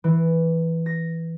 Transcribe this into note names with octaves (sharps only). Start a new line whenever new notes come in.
E3
A#6